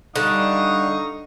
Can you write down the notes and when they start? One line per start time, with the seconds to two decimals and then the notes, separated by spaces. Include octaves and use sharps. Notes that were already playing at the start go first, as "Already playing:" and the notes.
0.16 D3 G3 D#4 F5 C#6 D#6